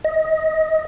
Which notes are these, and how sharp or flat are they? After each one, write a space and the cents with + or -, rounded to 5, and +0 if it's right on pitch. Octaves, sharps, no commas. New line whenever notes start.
D#5 +25